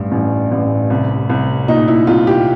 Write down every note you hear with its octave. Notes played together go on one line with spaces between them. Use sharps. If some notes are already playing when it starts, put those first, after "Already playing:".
Already playing: A1 G2
A1
A1
C2
C2
A#2 D#4
E4
C2 F4
G4